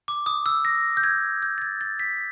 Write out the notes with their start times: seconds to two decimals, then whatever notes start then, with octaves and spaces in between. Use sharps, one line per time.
0.08 D6
0.26 D#6
0.46 E6
0.65 A#6
0.97 G6
1.04 G#6
1.43 G6
1.58 A6
1.62 G#6
1.81 A6
2.00 B6